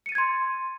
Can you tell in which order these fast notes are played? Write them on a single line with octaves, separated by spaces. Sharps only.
C#7 D#7 A6 G#6 C6